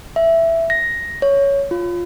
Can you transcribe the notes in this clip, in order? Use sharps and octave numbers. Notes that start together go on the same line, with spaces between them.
E5
A#6
C#5
F4